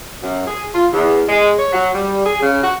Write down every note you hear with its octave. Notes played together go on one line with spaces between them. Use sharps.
F#2
G#4
F4
E2
G#3
C#5
F#3
G3
G#4
C#3
F#4